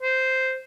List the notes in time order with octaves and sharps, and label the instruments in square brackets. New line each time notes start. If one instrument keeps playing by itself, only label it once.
[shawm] C5